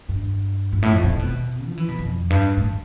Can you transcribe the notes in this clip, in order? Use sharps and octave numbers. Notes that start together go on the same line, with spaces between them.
G2
G2
A2
F2
B2
C3
B2
F3
E3
B2
F2
G2
A2